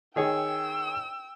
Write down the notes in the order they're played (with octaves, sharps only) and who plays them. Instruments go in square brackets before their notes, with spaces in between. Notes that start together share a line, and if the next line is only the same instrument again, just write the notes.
[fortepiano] D#3 G#4 C#5 [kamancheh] G5 E6